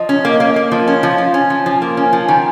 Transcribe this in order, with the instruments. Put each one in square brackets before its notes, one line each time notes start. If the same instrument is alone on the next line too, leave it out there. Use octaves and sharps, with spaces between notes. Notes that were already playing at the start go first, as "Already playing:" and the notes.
Already playing: [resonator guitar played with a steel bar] F3 [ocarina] D#5
[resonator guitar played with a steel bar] C#4
A#3
A#3
A#3
F3
C#4
[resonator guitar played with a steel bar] F3 [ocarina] F5
[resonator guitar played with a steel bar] F3
[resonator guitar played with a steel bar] C#4 [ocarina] G#5
[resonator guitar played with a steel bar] F3
[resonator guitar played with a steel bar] F3 [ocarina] G#5
[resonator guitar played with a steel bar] A#3
C#4
F3
D#3